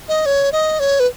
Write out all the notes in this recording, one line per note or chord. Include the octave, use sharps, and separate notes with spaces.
D#5
C#5
D#5
C#5
B4